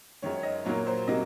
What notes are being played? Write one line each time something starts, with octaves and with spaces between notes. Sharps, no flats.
F#2 D#3 G#3 C#5
C#5
D#5
A#2 F#3 A#3 C#5
C5
C3 F#3 A#3 D#5